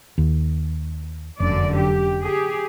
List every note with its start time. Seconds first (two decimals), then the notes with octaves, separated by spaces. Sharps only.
0.18 D#2
1.40 F1 F#2 D3 D5
1.77 G4
2.23 G4 G#4